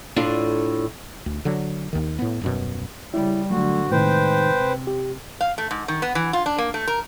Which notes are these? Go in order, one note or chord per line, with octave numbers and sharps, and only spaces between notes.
A2 D4 F4
D2
D3 F#3
D#2 D#3
A2 B3
D#1 F#2 B2
C#3 G3 E4
D3 F#3 A3 F#4
A2 C3 D#3 G#3 D#4 B4 C5 G5
C3
G4
F5
A3
G#2
D#3
B3
E3
F4
D4
A#3
A3
A#4